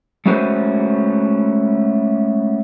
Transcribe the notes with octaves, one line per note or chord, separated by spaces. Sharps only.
G#3 A3 C#4 F#4 B4 C5